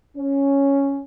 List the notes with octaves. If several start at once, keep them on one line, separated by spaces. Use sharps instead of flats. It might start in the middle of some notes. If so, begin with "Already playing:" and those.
C#4